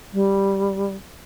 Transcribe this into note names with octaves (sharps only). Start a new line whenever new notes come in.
G3